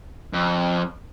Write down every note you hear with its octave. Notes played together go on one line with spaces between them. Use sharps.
F2